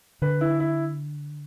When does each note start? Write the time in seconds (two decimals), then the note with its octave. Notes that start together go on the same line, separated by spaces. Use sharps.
0.22 D3 B4
0.41 E4
0.60 E4